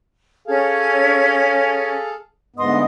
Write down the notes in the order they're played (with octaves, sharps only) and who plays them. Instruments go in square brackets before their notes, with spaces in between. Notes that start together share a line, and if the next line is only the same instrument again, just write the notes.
[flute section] C#4 C#5 G#6 [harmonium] G#4 A4 F5
[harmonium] D2 G#2 B3 [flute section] D#5 C6 D#6